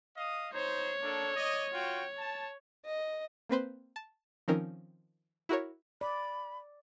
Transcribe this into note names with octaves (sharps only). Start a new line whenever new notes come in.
D#5 F5 D#6
D#4 C5 C#5
A#3 D4 A4
D5 D#5
F4 F#4 G5
A5
D#5
A#3 C4 B4 C5
A5
D#3 F3 C4 C#4 D#4 A#4
E4 F#4 A#4 C#5
D5 B5